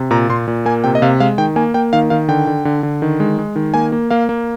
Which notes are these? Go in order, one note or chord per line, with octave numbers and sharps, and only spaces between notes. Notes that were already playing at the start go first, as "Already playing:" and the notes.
Already playing: C3
A#2 A#5
A#2 C6
A#2
A#3 G#5
C3 G5
D#5
C3 F5
G#3 F5
D#3 G5
A#3 G#5
A#3 G5
D#3 F5
D#3 F5
D3 G5
D3
D3
D3
D#3
G#3
G#3
D#3
A#3 G#5
A#3
A#3 F5
A#3